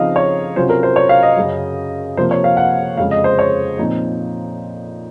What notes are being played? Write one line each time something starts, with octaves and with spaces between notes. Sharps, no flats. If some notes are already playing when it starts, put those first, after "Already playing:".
Already playing: C#3 F3 C4 D#4 D#5 F5
C#5
C3 F#3 C#4 F4 C5
A#4
C5
C#5
F5
D#5
F#2 C#3 F#3
C3 F3 A#3 C5
C#5
F5
F#5
F2 C#3 G#3 F5
D#5
C5
C#5
A#2 F3 C4 D#4